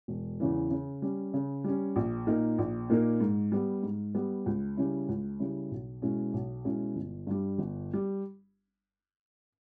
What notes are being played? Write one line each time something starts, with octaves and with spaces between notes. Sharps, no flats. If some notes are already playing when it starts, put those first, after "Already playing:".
E1
E2 C#3 E3
C#3
G3 C#4
C#3
G3 C#4
A#1
A#2 A#3 D#4 A#4
A#1
A#2 A#3 D#4 A#4
G#2
G3 B3
G#2
G3 B3
C#2
C#3 G3 C#4 E4
C#2
C#3 G3 C#4 E4
B1
B2 G#3 C#4 E4
B1
B2 G#3 C#4 E4
G1
G2 G3
G1
G3